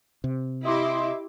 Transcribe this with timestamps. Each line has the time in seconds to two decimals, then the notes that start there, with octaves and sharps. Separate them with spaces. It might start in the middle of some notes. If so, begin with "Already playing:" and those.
0.24 C3
0.64 E4 G4 D#5 E5 C6 D6